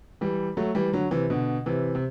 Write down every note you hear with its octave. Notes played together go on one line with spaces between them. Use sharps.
E3 G3
F#3 A3
E3 G3
D3 F#3
C3 E3
B2 D3
C3 E3
C3